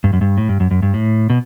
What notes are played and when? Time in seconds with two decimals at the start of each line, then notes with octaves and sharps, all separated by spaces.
0.04 G2
0.13 F#2
0.21 G2
0.38 A2
0.49 G2
0.60 F#2
0.71 F#2
0.82 G2
0.94 A2
1.30 B2